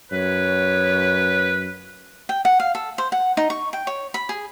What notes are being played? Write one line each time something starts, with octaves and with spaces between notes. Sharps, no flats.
F#2 B4 C#5
G5
F#5
F5
A4
C5
F#5
D#4
C#6
G5
C#5
B5
G#4